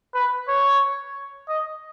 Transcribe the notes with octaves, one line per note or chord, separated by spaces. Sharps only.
B4
C#5
D#5